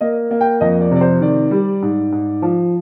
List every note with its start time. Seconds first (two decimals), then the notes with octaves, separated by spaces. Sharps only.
0.01 A#3 D#5
0.31 A#3
0.41 G5
0.61 F2 D#5
0.81 D5
0.91 C3 D5
1.01 C5
1.21 D#3 D5
1.51 G3
1.82 G#2
2.12 G#2
2.42 F3